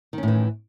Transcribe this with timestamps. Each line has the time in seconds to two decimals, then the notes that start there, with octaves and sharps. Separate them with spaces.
0.13 D#3
0.18 C#4
0.23 A2
0.28 E3